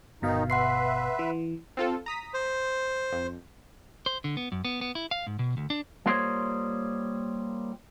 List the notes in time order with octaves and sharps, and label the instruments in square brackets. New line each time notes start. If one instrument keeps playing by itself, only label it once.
[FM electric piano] G1 B2 F5 [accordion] D#3 D#4
[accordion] B4 E5 [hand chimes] F#5 C6 C7
[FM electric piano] E3
[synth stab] C4 F4 A4
A#5 D#6 B6
[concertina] C5
[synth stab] F2
[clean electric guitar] C5
D3
B3
F#2
B3
B3
E4
F5
G#2
B2
D2
D4
G3 A#3 F4 C5 C#5 D#5